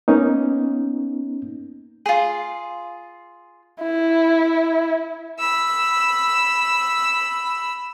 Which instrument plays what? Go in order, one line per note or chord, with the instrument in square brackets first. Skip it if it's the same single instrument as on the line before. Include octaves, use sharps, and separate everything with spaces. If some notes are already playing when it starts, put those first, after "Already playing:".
[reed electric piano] A#3 B3 C#4 D#4
[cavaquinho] F4 G#4
[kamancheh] E4
[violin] B5 E6